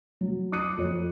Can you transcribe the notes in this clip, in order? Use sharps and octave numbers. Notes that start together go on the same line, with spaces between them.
F#3
D6 D#6 F#6 C#7 D#7
F2 C#5